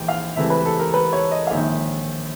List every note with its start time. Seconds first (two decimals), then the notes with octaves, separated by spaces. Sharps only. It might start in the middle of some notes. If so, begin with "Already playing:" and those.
Already playing: A#1 G#2 E3 G5
0.08 F5
0.36 C#2 C3 E3 A3 E5
0.50 B4
0.65 A4
0.80 A#4
0.94 B4
1.13 C#5
1.31 D#5
1.47 F5
1.51 A#1 G#2 D#3 E5